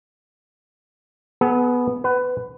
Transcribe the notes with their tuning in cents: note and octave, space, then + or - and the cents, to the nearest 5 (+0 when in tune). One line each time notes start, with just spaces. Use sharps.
B3 +0 G#4 +40
B4 +20 F#5 +25